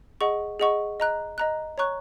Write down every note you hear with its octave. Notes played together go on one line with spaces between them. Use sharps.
G#4 D#5 F#5 C#6
G#4 D#5 F#5 C#6
D#5 A#5 F#6
D#5 A#5 F#6
C#5 A#5 C#6 F#6